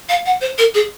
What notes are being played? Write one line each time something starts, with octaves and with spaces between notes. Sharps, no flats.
F5
F#5
C5
A#4
G#4